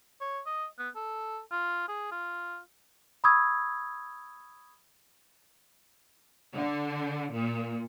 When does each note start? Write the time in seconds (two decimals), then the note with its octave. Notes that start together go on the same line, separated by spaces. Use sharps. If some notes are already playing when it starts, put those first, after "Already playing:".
0.21 C#5
0.46 D#5
0.79 B3
0.96 A4
1.52 F4
1.88 G#4
2.12 F4
3.24 B5 C#6 D#6 E6 G#6
6.54 D3
7.33 A#2